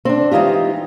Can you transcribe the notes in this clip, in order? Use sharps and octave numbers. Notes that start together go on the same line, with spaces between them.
C4 D4
E3 G#3 D#4 F4 G4